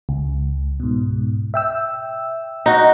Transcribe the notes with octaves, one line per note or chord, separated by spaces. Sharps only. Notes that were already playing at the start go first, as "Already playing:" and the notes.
C#2
G#2 B2
E5 G5 E6
D#4 F#4